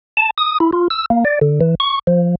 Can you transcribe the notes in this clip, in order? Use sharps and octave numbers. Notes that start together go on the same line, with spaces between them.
A5
D#6
E4
F4
E6
A#3
D5
D3
E3
C#6
F3